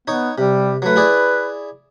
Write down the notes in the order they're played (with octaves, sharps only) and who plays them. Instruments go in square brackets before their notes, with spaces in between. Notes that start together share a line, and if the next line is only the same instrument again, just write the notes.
[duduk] B3 [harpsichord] D#4 C#5
[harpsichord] C3 [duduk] G3
[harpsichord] F#3 A3 [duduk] B4
[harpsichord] E4 G#4 D5